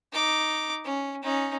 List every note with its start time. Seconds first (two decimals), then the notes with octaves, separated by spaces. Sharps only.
0.12 D#4 D6
0.84 C#4
1.23 C#4 D#4